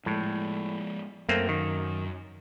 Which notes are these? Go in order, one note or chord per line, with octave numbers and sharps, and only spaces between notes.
A2 F3 G#3
F#2 A3 A#3 C4
D#3